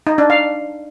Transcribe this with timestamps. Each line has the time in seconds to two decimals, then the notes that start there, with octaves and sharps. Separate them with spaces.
0.07 D#4
0.18 D4
0.30 F5